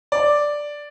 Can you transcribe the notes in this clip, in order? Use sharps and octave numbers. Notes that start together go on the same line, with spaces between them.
D5